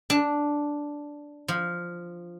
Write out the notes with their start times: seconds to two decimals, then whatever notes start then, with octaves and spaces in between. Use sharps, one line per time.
0.10 D4
1.48 F3